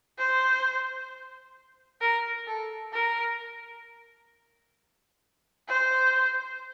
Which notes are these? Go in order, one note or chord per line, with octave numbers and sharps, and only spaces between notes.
C5
A#4
A4
A#4
C5